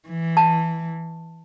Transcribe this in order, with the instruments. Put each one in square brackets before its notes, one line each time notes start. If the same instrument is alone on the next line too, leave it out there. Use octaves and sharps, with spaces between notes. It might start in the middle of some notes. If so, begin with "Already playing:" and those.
[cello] E3
[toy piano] A5